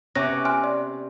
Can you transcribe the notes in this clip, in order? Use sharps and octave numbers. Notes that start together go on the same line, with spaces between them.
C3 B3 C#4 C#5 D6 F#6 A#6
G#5 C6 F6 F#6
D5